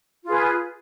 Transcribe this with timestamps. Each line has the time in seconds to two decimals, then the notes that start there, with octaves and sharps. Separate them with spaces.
0.24 F4
0.27 G#4
0.29 B4